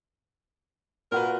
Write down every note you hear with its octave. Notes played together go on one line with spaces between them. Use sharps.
A#2 F#4 A#4 B4